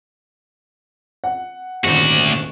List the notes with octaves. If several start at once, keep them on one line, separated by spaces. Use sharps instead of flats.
F#5
D#1 G#1 D2 F#4